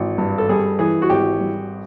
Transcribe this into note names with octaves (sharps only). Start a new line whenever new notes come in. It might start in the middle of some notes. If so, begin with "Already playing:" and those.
Already playing: G#1 E3
G2
A4
G3 G#4
E3 G#4
F#4
G#1 G4
G3